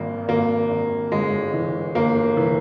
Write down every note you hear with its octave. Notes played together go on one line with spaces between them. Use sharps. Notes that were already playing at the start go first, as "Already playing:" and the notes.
Already playing: G#1 G2 A#3
G#1 A#3
G#1
G1 G#3
E3
G1 A#3
E3